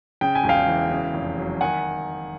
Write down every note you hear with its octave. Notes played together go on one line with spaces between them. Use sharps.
C#3 G5
G#5
E1
F5 G5
E3
C#3
F1
F#3
D#3 F#5 G#5